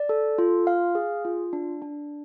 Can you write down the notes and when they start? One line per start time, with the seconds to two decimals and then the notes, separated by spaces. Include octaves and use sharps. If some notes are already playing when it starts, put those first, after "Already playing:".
Already playing: D5
0.09 A4
0.38 F4
0.67 F5
0.95 G#4
1.25 F4
1.53 D4
1.82 D4